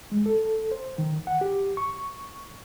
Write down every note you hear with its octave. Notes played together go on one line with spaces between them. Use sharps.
G#3
A4
C5
D#3
F#5
G4
C#6